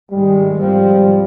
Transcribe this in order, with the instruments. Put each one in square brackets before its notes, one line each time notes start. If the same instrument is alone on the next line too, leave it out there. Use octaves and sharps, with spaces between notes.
[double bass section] G#2 D#3 G#3 [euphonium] G3
[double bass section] G#2 F3 C4 [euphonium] G3